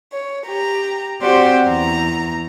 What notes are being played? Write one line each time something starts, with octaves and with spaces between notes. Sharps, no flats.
C#5
G4 A#5
C4 F#4 G4 C5 D5 F#5
E2 A#5